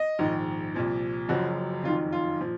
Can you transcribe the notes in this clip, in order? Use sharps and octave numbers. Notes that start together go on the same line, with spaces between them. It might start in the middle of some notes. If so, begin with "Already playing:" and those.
Already playing: D#5
A#1 G#2 D#3
C2 A#2 F3
F#1 F#2 C#3 F3 F#4
F#1 F2 D#3 F4
F4
A#2 F3